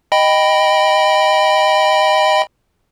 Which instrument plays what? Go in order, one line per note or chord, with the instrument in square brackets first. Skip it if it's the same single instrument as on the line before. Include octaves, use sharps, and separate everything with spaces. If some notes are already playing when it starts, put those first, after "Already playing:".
[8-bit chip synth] D#5 G5 B5